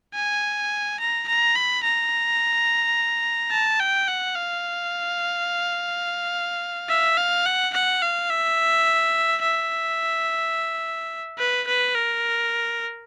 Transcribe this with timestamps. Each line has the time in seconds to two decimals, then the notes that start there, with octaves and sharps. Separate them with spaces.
0.15 G#5
1.00 A#5
1.28 A#5
1.56 B5
1.83 A#5
3.52 A5
3.80 G5
4.08 F#5
4.36 F5
6.89 E5
7.17 F5
7.45 F#5
7.73 F#5
8.02 F5
8.30 E5
9.42 E5
11.39 B4
11.67 B4
11.95 A#4